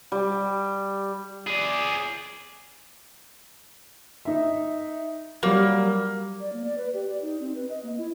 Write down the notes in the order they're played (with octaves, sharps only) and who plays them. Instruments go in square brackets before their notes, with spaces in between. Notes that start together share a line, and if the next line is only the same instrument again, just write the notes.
[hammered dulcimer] G3
[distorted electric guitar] G#4 D5
[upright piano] D#4 E5
[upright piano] F#3 G3 [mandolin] A#3
[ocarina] D5
A#3
D5
B4
G4
D5
D#4
C4
B4
D#5
A#3
E4